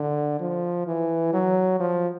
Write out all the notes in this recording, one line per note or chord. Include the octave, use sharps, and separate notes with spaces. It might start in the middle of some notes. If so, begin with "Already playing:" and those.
Already playing: D3
F3
E3
F#3
F3